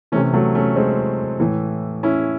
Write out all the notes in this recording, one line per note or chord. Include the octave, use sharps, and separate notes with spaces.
C3 E3 A3 C#4
F#3 A3
A3 C#4
G#3 C4
A2 E3
C#4 E4